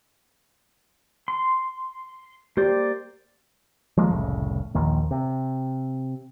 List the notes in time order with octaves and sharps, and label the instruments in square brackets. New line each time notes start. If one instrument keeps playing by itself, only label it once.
[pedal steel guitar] C6
[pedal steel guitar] A#3 C5 D5 [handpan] G4
[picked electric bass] F3 G#3 A#3
F1 C2 A2 C#3
A#1 D#2 D#3 A#3
C3